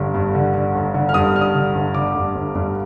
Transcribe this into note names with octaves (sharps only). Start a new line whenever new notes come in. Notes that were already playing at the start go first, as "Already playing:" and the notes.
Already playing: G1 G2 D3
G2
D3
D3
G1
D3
F6
G2 D#6
D3 F6
D#6
D3
G1
D3 D6
G2
G1
G2